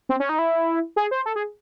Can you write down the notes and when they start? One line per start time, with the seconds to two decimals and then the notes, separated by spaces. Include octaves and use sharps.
0.09 C4
0.20 C#4
0.29 D#4
0.39 E4
0.96 G#4
1.11 C5
1.26 A4
1.36 G#4